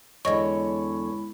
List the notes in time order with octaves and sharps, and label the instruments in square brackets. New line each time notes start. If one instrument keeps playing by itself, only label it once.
[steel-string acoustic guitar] E2 D3 [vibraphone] G#3 E4 B5 [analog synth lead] C#5 [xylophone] D#5 C#6